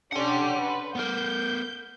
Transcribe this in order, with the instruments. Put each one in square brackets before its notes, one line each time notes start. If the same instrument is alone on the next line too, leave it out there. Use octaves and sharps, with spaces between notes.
[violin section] C#4 D4 G4 [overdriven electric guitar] F#5 C6
[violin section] B4
[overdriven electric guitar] B3 A#4 [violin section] G6